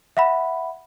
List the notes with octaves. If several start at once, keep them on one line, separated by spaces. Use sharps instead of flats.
E5 F#5 B5